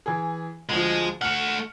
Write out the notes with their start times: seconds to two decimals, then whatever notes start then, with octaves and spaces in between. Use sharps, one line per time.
0.06 E3 G#4
0.69 D2 F3 G#3
1.22 A3 F#5 F6 C#7